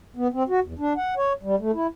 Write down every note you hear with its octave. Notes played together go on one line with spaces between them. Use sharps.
B3
C4
F#4
E2
D4
F#5
C#5
G3
A3
E4